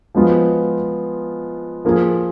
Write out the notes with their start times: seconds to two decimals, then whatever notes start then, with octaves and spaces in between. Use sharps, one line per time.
0.15 F3 G#3 B3 F4
1.85 F3 A#3 F4 G#4